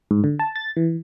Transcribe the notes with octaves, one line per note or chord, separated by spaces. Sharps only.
G#2
D3
A5
A6
E3